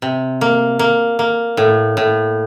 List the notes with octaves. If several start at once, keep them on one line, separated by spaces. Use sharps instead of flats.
C3
A#3
A#3
A#3
A2
A2